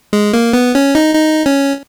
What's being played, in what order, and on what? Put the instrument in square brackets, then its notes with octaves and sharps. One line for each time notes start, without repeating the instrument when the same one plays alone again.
[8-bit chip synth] G#3
A#3
B3
C#4
D#4
D#4
C#4